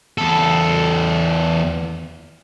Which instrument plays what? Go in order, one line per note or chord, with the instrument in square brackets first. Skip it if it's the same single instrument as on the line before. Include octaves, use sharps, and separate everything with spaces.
[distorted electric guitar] E2 A4